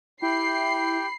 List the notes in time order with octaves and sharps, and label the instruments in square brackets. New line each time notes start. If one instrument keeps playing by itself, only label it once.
[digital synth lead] E4 [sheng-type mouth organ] G4 G5 [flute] B5 [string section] C7